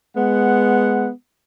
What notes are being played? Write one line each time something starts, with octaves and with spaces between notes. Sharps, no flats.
G#3 B3 F#5